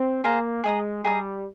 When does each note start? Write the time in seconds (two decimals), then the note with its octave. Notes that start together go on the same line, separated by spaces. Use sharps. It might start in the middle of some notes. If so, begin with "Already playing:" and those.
Already playing: C4
0.24 A#3 G#4 C5 F5 A#5
0.64 G#3 G#4 D#5 A#5 D#6
1.04 G3 G#4 D#5 A#5 D#6